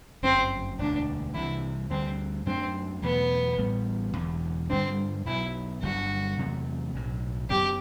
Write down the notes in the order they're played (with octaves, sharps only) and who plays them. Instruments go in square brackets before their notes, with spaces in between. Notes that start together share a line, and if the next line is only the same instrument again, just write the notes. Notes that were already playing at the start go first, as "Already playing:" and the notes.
[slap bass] G1 F#2 F#3 [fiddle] C4
[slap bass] E1 D2 D3 [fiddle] D4
[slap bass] C2 C3 E3 [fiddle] E4
[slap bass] D2 D3 G3 [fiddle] C4
[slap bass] F#2 F#3 A3 D4 [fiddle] C4
[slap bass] E2 B2 F#3 A3 [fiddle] B3
[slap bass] A1 A2 G3 B3
E1 E2 D3
[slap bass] G2 D3 G3 D4 [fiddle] C4
[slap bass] B1 B2 F#3 [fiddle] E4
[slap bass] G1 G2 D3 F#3 [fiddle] F#4
[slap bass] E2 C3 F#3 A3
B1 A2 F#3
[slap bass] F#1 F#2 F#3 B3 [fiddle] G4